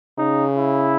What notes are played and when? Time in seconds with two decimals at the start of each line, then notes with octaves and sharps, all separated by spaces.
0.18 C#3 D#4
0.56 E4